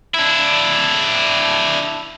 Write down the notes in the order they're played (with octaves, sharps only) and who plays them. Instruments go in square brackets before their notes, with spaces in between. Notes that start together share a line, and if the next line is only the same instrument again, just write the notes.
[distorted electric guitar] D4 E4